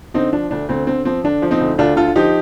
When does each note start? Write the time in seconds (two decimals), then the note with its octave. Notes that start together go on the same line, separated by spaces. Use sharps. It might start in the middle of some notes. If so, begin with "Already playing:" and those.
0.14 D3 C4 D#4
0.33 F3 D4
0.51 D2 D4
0.69 D2 C4
0.87 D3 C4
1.05 F3 C4
1.24 D3 D4
1.42 F3
1.51 C4 D#4
1.61 D2
1.78 D2 D4 F4
1.96 D3 F4 A4
2.16 F3 D#4 G4